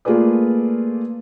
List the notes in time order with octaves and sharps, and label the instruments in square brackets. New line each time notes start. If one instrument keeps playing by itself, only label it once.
[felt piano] A3 A#3 F4 G#4 B4 D5